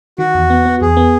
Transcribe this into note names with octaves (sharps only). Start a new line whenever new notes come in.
D#3 F#4
E2
B3
B3
E2 G#4
B3